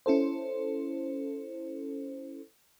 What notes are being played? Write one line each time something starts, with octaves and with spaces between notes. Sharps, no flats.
C#4 E4 A4 C5